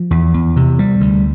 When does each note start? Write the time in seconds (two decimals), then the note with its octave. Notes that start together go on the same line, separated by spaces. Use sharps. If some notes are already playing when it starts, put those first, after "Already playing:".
Already playing: F3
0.11 E2
0.34 E2
0.56 C3
0.79 G3
1.00 D2